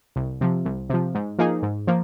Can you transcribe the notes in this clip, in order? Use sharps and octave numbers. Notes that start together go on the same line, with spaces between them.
C2
C3 F3
C2
C3 F3
G#2
F3 A#3 D#4 G#4
G#2
F3 A#3